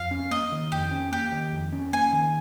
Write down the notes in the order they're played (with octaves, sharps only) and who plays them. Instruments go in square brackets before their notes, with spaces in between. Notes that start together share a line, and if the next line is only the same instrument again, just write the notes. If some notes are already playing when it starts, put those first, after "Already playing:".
Already playing: [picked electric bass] F2 [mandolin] F5
[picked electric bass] C#4
[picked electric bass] A#3 [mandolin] D#5
[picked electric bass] D#3
[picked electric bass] F2 [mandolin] G4
[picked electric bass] C#4
[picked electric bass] A#3 [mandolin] G4
[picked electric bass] D#3
F2
C#4
[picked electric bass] A#3 [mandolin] G#5
[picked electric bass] D#3